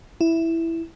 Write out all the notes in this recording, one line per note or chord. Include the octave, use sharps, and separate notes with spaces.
E4